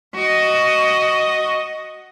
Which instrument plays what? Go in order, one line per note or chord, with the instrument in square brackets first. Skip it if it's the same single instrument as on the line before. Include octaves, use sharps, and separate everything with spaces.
[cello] F#4 D#5